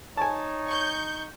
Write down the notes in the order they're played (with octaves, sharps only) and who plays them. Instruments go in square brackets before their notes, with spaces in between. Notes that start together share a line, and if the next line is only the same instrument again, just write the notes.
[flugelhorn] D#4 [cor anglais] C#5 [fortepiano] G#5 A5
[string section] C#6 G6